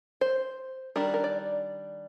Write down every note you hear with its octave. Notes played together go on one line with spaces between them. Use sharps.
C5
D#3 G3 D4 A#4
A#4
D5